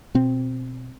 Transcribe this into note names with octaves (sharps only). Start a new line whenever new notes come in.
B2 C4